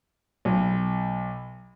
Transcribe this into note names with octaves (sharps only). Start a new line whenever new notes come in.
B1